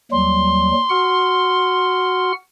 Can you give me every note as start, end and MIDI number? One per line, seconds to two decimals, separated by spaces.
0.12 0.72 39
0.12 0.72 54
0.12 0.72 55
0.12 2.32 84
0.90 2.32 66
0.90 2.32 78
0.90 2.32 89